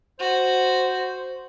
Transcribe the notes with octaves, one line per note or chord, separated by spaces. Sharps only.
F#4 C5